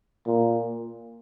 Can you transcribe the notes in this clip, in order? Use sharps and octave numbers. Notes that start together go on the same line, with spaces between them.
A#2